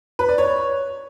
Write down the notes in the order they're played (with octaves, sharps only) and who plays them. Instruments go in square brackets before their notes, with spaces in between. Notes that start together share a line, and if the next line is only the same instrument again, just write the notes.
[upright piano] B4
D5
C#5